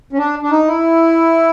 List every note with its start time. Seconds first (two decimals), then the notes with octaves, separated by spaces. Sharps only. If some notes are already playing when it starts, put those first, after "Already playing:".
0.13 C#4
0.18 D4
0.42 D4
0.51 D#4
0.68 E4